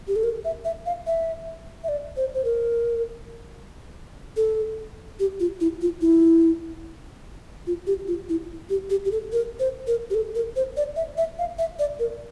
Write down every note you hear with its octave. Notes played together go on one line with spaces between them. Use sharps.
G4
A4
A#4
E5
E5
F5
E5
E5
D5
C5
C5
A#4
A4
G4
F4
E4
F4
E4
F4
G4
F4
E4
G4
G4
G4
A4
A#4
C5
A#4
G4
A4
A#4
C5
D5
E5
E5
F5
E5
D5
A#4